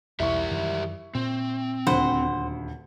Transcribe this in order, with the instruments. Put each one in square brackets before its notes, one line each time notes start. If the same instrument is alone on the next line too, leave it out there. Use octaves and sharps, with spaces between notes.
[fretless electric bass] B1 E2 [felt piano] E4 C#6 [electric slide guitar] G4 A#4 E5
[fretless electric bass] F#2 D#3 E3
[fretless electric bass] A#2 [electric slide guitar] C4
[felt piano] D#1 D2 B5 [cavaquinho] C5 F#5